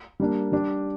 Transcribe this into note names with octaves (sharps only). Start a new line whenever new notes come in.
G3 A#3 D4
G3 D4 G4